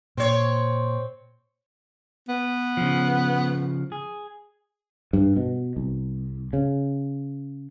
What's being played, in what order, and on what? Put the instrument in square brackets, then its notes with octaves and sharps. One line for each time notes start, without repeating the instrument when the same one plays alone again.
[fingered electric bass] A#2 [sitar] C4 C#5
[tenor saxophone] B3
[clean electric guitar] C#3 F3
G#4
[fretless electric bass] G2
B2
C2
C#3